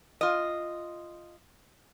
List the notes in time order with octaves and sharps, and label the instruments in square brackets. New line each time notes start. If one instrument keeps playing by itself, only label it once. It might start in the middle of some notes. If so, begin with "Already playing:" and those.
[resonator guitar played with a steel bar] F4 D#5